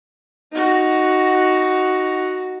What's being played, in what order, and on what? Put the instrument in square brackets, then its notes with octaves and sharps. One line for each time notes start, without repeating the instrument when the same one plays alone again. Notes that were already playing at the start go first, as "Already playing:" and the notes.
[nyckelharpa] D#4 F#4